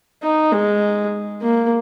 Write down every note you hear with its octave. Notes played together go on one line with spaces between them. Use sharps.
D#4
G#3
A#3